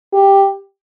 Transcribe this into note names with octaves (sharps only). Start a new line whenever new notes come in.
G4